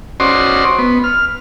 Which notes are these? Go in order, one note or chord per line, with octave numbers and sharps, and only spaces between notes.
C#4 F#4 C5 D5 D#5 C6
B3
F6